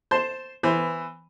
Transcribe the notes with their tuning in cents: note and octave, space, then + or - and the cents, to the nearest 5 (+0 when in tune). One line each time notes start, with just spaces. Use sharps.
C5 +0 A5 +0 C6 -5
E3 +0 B3 +15 C5 +0